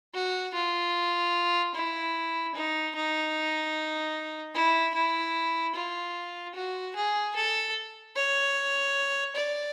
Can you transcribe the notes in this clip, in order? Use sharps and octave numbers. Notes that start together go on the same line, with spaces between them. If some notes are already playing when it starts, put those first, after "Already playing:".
F#4
F4
E4
D#4
D#4
E4
E4
F4
F#4
G#4
A4
C#5
D5